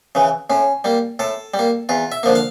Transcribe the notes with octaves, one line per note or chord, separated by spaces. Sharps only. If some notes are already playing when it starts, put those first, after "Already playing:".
C#3 E3
A2 C#4
G3 A#3
A2 A4
G3
A#3
E2 F4
E5
D3 F3 A#3
F5